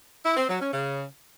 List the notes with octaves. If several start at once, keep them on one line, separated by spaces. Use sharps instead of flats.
E4
C4
F#3
C#4
C#3